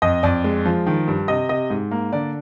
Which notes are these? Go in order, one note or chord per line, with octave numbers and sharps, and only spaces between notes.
F2 D#5
F2 D5
G#3
F3
D#3
G2
C3 D#5
C3 D#5
G#2
A#3
D3 D5